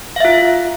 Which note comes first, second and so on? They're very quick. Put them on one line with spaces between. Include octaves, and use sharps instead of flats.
F5 E5 F4